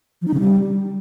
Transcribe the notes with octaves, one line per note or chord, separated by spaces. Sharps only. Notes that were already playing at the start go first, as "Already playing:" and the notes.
F3
D#4
C#3
G3